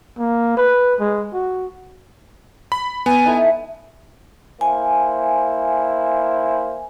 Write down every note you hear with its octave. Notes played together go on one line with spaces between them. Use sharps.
A#3
B4
G#3
F#4
B5
B3 G#5
D#4 E4 A4
A#3 E4 C5 G#5